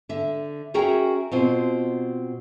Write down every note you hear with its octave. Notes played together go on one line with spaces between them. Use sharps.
D3 E5
C#4 F#4 G#4 A#4 E5 G5
B2 C4 F4